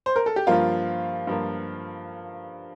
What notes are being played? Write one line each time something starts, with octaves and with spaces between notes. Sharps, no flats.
C5
A#4
A4
G4
G2 F3 A#3 F4
G2 F3 A#3